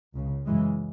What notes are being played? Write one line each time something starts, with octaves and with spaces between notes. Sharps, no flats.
C#2 C#3
F#2 C#3 E3 G#3